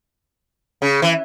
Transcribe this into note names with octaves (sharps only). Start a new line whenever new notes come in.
C#3
E3